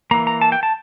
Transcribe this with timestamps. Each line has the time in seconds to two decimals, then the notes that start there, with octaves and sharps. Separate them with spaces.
0.11 E3 A#3 A#5
0.27 A#5
0.41 A5
0.52 G5
0.63 A5